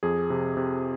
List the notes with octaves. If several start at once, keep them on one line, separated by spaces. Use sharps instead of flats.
F2 G#4
C3
C3